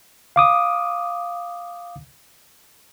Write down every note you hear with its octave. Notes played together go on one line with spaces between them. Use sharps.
F5 D6 D#6